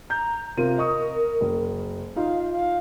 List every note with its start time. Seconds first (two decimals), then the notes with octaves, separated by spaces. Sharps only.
0.10 A#5 G6
0.57 C3 F4 A#4 D#7
0.78 D#5 C#6 D#6
1.41 F#1
2.16 D#4 F4 F5
2.53 F5